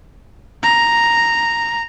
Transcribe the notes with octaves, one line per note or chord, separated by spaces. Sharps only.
A#5